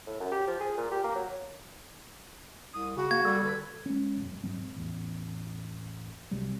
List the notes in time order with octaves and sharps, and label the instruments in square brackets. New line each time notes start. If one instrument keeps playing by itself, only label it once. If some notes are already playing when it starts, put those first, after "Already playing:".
[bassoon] A2
F#2
G4
F3
G#4
A#2
G4
A#3
F#3
[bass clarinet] C2 [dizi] D#6
[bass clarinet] C#3 [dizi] F#4
[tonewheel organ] A#3 [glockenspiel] G#6
[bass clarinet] G3 [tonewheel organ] A4
[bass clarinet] D3 [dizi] B4
[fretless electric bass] G#3 C#4
E1 F#2
D#1 G#2 F#3 C4
A1 E2
C2 C3 F#3 G3